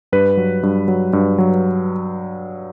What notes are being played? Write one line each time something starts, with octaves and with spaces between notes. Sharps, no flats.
G2 B4
F#3
G2
F#3
G2
F#3